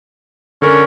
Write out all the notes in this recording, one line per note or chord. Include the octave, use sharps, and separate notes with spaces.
D3 C#4 A4 A#4